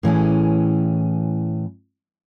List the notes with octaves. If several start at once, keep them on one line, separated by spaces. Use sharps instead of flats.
A2 E3 C#4 G#4